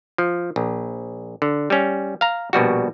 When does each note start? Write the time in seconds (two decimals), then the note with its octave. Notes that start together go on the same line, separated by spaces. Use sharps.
0.18 F3
0.56 A#1
1.42 D3
1.70 G3 C#4
2.21 F5 A#5
2.53 A#1 B2 G3 F#4